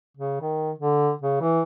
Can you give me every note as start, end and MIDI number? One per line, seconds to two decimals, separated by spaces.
0.17 0.38 49
0.41 0.71 51
0.78 1.11 50
1.22 1.36 49
1.41 1.62 52